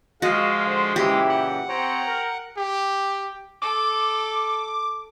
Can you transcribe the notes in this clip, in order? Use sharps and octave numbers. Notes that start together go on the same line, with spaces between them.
F3 G#3 F#4 D#5 F5
D3 C5
A#2 C#3 E3 G#3 E4 G4 G5
F#5
C4 C5 C#5 G5 A#5
A#4
G4
A4 D6